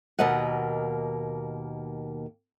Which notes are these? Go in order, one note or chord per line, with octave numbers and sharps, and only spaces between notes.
D#2 B2 A#3 D#5 F#5